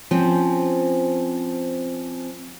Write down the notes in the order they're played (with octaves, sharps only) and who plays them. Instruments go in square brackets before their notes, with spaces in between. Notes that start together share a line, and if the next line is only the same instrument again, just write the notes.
[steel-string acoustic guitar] F3 C4 C#4